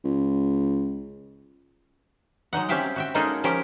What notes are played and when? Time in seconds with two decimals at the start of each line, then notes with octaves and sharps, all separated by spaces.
0.05 C#2
2.53 F#3 G#3 D#4 F#5
2.69 C4 C#4 G4 E5 F5 G5
2.96 F#4 E5 G5
3.14 G#3 A#3 C#4 D#4 G#4 A4
3.44 F3 C#4 G4 A#4 C5